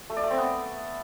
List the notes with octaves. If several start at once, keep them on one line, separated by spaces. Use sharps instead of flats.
A3
D5
A3
C4
B3